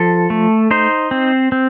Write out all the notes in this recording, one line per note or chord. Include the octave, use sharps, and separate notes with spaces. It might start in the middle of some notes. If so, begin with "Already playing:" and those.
Already playing: F3 A4
A3
D#4 C5
C4
C4